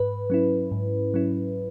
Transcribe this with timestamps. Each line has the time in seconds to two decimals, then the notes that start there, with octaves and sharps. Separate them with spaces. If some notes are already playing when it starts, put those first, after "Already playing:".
Already playing: G#2 B4
0.30 F#3 C#4 E4
0.71 G#2
1.14 F#3 C#4 E4